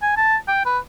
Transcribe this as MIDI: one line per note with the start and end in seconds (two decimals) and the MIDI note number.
0.02 0.15 80
0.17 0.36 81
0.48 0.64 79
0.66 0.78 71